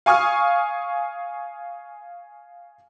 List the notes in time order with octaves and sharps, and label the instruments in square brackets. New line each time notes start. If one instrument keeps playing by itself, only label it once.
[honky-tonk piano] F5 G#5 C#6 D#6 F6